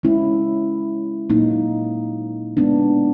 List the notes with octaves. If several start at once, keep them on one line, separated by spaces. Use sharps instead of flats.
G#3 C#4 E4
A#2 F#3 A#3 D#4
G#3 B3 D4